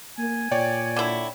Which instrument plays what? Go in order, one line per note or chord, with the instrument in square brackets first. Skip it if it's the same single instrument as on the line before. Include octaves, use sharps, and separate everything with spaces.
[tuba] A#3 [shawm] G#5
[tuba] A#2 [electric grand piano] C#5 D5 G5
[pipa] D3 E4